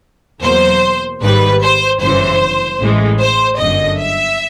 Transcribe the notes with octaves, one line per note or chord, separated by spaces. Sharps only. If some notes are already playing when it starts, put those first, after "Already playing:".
E2 B2 F#3 A#3 C5
G#1 G#2 D#3 G3 B4
C5
G1 F#2 C#3 E3 C5
A1 A2 E3 G#3
C5
G1 F#2 D3 D#5
E5